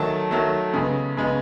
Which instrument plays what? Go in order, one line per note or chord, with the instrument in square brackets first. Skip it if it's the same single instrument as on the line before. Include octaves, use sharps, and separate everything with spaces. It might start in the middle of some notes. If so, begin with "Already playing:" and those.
Already playing: [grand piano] D#3 F#3 A3 A5
D#3 F#3 A3
C#3 G#3 B3
C#3 G#3 B3